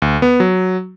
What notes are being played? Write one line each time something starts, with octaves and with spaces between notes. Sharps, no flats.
D2
B3
F#3